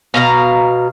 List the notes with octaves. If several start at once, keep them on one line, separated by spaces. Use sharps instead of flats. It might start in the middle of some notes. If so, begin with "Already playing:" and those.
B2 F5 A#5